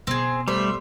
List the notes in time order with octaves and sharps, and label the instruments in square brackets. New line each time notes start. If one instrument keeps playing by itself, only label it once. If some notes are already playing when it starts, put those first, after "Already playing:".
[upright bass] B2 [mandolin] C4 G#4
[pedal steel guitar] G3 A3 [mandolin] C5 E5